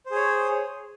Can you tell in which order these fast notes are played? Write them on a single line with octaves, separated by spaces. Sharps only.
C5 G#4 C#5